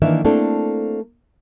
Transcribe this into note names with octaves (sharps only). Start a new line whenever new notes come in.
D#3 E3 A#3 D4 E5
A3 A#3 C4 D4 E4 A4